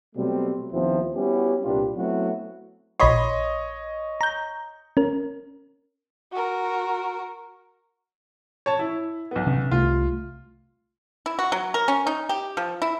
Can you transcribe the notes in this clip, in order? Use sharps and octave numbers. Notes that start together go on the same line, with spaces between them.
B2 F#3 G3 A3 C4
D#2 F3 B3 C4 E4 C5
G3 B3 C#4 E4 F#4 G4
C2 A#2 D4 F4 G4 B4
F#3 A3 B3 C4 E4 F#4
A#1 C#5 D#5 B5 C6
A#5 G6
C#4 A#4
F#4 A#4
C#5 A5
E4
B1 B3
C3 C#4
C2 C3 A3 F4
E4
F#4
F#3
A#4
C#4
D#4
G4
F3
E4